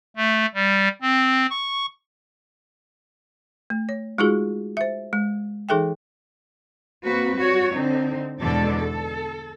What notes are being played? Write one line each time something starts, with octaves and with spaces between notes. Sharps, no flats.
A3
G3
C4
C#6
A3
C#5
G#3 D#4 F4 F#4 G#4
C5 E5
G#3
E3 D#4 G#4 A4 E5 G5
A#3 C4 F#4 B4
G3 F#4 C#5
D3 C4 D#4
E2 G#2 B2 D3 A4 D5
A4